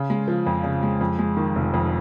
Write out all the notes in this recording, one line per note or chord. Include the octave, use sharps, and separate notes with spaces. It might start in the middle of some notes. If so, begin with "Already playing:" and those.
Already playing: C#3
G#3
F3
F2
C#3
G#3
F2
G#3
D#3
F1
F2